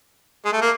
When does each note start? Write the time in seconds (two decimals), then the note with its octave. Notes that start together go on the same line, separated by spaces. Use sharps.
0.45 G#3
0.53 A3
0.61 A#3